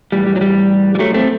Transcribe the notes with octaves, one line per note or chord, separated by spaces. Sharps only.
A2 E3 G3
G3
F#3
G3
G3
F#3 A3
A3 C4